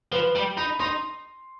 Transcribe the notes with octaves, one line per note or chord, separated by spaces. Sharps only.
F3 B4
G3
D#4 B5
D#4 C6